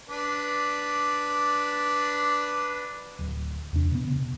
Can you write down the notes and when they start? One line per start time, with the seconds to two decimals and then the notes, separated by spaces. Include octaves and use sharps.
0.09 D4 B4 D5
3.19 D1
3.73 E2 C3 D4
3.92 B2 B3
4.08 C#3